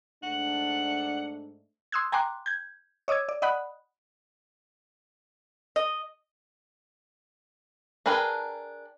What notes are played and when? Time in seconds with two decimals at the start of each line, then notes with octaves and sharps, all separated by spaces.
0.23 G#2 A3 D4 F#5
1.92 C6 D#6 E6 F#6 G#6
2.12 G5 G#5 A#5 C6 D6 F#6
2.46 G6 G#6
3.08 C#5 D#5 D6 E6 G#6
3.29 D5
3.42 D5 D#5 F#5 B5 D#6 F#6
5.76 D#5
8.06 D4 G#4 A#4 B4 G5